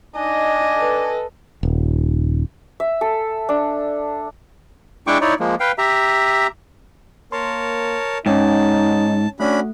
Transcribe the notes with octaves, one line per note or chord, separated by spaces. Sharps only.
D4 D#4 D#5 G#5
A4 B4
D#1
E5
A4
D4
G#3 D4 E4 G5 C#6 D6
D#4 E4 C#5 D5
F3 G#3 A#3
B4 F5 G5
G4 E5 A#5
A#3 A#4 C#5 A5 C6
G#2 C#4 D#4 C#5 G5 A5
A3 C#4 D4 F#4 B5